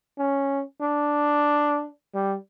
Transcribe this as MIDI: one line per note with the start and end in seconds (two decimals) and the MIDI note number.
0.18 0.62 61
0.82 1.88 62
2.15 2.36 55